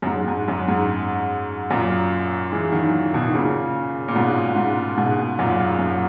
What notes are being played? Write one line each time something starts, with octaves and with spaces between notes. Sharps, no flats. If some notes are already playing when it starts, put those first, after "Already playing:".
F#2
G#2
G#2
F#2
G#2
F#2 A#2
E3 G#3
D#3 F#3
B2 D#3
D#3
A#2 C#3
A#2
G#2 B2
G#2
G#2 B2
F#2 A#2
F#2